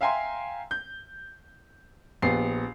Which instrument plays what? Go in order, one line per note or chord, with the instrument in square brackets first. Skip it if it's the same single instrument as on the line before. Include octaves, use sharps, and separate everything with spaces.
[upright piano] E5 F5 G5 G#5 A#5 C6
G6
A#1 B3 G4 C7